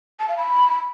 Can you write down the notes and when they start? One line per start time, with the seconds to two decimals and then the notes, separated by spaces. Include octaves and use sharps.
0.20 A5
0.29 F5
0.37 B5